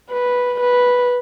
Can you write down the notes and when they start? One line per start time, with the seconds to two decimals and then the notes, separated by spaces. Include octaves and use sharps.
0.10 B4
0.60 B4